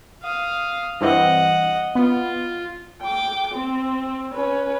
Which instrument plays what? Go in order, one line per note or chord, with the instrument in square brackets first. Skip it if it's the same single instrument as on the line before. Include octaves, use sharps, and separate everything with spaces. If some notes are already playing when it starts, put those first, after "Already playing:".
[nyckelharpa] F5 D#6
[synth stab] G2 E3 C4 [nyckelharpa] D#5 F#5
[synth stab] B3 [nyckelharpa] F4
[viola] G5 D6
C4
C#4 B4